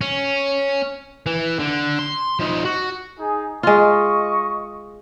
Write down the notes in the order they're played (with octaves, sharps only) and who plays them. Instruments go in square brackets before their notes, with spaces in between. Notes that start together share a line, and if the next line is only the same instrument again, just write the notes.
[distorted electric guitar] C#4
E3
D3
C6
F3 D#4
F#4
[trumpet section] D#4 G#4
[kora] G#3 F4 [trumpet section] D#5 C#6